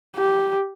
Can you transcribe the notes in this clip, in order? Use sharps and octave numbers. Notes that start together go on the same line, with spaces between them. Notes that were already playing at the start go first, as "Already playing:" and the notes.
G4